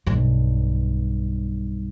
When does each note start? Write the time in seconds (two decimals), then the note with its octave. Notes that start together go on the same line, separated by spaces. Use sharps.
0.07 B1 G2